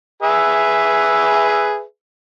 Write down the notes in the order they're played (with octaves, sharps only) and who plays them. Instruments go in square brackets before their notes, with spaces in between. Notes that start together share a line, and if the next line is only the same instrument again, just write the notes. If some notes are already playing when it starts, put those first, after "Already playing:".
[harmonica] G#4 B4 E5